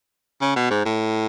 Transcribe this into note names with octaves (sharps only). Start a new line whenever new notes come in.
C#3
B2
G#2
A2